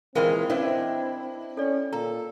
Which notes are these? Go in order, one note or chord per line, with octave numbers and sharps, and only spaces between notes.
A#2 E3 G#3 C4 A#4 E5 F5 G5
C#4 D4 E4 B4 C5 D#5 F5 G5
C#4 A4 D5
A#2 A4 A#5